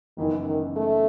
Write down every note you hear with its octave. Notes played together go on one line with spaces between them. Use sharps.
F#1 F#2 D#3 E3 B3 D#4
D#3
A3